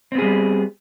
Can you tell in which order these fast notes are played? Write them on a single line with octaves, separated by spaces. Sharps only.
C4 B3 G#4 G3